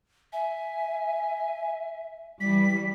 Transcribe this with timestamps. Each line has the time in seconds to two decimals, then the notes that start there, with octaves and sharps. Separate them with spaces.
0.33 E5 G#5
2.41 E3 G3 B6